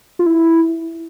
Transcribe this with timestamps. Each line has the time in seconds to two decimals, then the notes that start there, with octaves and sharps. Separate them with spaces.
0.19 F4
0.26 E4